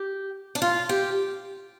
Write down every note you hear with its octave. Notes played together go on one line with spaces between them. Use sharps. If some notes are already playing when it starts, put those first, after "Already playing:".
Already playing: G4
D4
F4
G4